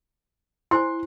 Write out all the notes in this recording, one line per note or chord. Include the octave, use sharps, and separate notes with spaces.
E4 C5 G#5 C6